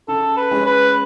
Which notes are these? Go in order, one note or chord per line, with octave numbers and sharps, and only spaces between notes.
C#3 A4
B4
G#3 C#4
B4